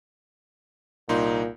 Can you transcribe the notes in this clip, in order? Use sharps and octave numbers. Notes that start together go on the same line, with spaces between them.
C2 A#2 D#4 C6